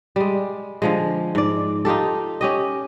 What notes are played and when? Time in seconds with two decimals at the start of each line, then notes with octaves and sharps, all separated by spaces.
0.16 G3 G#3
0.82 D3 F3 G#3
1.35 G#2 D5
1.85 D#4 F4 G4 A4
2.41 C#4 G4 D#5